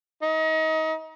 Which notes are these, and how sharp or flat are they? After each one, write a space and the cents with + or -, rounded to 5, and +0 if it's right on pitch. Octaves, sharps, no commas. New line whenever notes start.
D#4 +30